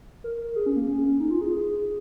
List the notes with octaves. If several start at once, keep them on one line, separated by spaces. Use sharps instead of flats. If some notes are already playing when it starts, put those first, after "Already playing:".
A#4
G#4
C#4
A#3
C#4
D#4
F4
G#4
G#4